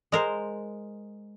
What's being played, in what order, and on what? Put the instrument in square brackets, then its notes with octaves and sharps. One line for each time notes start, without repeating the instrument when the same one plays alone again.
[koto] G#3 A#4 C5